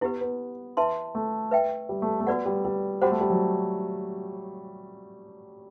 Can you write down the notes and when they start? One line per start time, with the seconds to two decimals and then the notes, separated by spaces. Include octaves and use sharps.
0.01 B3 E4 G4 B4
0.21 B3
0.77 E4 B4 E5 A5 C6
1.15 A3
1.51 B4 E5 G5
1.89 G3
2.02 A3
2.20 A3
2.27 B3 F#4 B4 D5 F#5
2.46 G3
2.65 G3
3.01 G3 F#4 C5 F#5
3.11 A3
3.21 G3
3.30 F#3